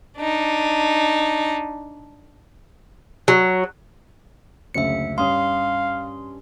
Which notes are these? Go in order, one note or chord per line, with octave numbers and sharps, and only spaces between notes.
D4 D#4
F#3
F#1 D2 C#3 E5 C#7
G2 C#4 F5 C6 D#6